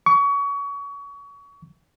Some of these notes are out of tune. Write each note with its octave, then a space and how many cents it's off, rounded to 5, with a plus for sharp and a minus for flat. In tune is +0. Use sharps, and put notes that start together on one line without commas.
C#6 +30